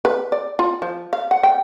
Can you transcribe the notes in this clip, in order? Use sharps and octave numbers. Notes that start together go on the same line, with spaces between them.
B4
D5
F4
F3
F5
F#5
G5